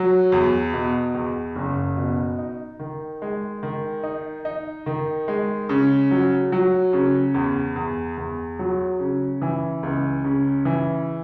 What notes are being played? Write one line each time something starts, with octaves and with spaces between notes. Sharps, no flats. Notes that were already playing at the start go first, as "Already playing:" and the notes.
Already playing: F#3
E2
B2
E2
F#1
B2
D#4
D#3
G#3
D#3
D#4
D#4
D#3
G#3
C#3
F#3
F#3
C#3
E2
E2
E2
F#3
C#3
E3
C#2
C#3
E3